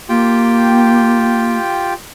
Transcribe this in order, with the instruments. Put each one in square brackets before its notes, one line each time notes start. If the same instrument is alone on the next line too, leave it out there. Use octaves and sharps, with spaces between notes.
[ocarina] A#3 [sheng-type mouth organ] F4 G4 G5